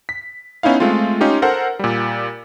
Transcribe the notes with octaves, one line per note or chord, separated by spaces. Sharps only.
B6
B3 C#4 D#4 E4 F5
G#3 A3 C4 F4
C#4 D#4 F4 G4
A4 A#4 C5 F#5
A#2 G3